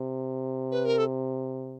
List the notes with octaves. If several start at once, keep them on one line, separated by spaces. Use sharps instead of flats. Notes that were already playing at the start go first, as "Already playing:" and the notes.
Already playing: C3
B4
A#4
A4